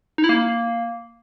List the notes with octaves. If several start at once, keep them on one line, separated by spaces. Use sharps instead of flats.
D#4
E4
A#3